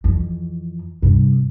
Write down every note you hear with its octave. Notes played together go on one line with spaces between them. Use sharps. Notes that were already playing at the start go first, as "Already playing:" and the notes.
F2 E3
G2 C3